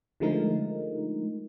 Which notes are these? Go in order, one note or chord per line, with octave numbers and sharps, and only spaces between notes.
D3 F3 G#3 A3 D#4 A#4